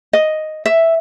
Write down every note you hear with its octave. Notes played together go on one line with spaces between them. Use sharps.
D#5
E5